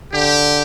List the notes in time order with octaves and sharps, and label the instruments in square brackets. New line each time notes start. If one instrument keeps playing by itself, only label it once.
[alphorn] D3 [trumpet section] G4